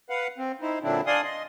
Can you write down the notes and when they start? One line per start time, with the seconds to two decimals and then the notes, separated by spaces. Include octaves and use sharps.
0.10 B4 F5 F#5
0.38 C4
0.61 D#4 E4 C5
0.83 A#2 D3 F#3 C4 D4 E4
1.06 D4 D5 F5 G#5 C6 D#6
1.24 D#5 C6